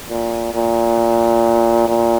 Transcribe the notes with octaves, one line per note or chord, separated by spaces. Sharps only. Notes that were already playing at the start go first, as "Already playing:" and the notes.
A#2
A#2
A#2